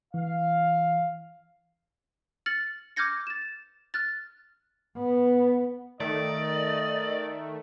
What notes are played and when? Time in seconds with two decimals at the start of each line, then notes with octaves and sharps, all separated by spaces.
0.14 E3 F5
2.46 F6 A6 C#7 F#7
2.96 D6 F6 G6 G#6 A#6 C#7
3.27 A6 E7
3.94 F6 F#6 A6
4.97 B3
6.00 D#3 A3 D5 D#5